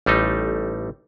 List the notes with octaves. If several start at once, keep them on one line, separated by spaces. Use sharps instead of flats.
A1 G3 A3 D#4